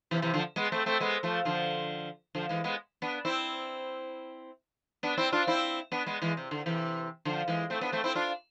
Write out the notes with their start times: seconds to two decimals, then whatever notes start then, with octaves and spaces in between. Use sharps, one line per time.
0.11 C3 E3
0.22 C3 E3
0.34 D3 F3
0.56 G#3 B3
0.72 A3 C4
0.86 A3 C4
1.01 G#3 B3
1.23 F3 A3
1.45 D3 F3
2.35 D3 F3
2.49 E3 G#3
2.64 G#3 B3
3.02 B3 D4
3.25 C4 E4
5.03 B3 D4
5.18 C4 E4
5.33 D4 F4
5.47 C4 E4
5.92 B3 D4
6.07 G#3 B3
6.22 E3 G#3
6.37 C3
6.51 D3
6.66 C3 E3
7.25 D3 F3
7.48 E3 G#3
7.70 A3 C4
7.81 B3 D4
7.92 A3 C4
8.04 C4 E4
8.15 D4 F4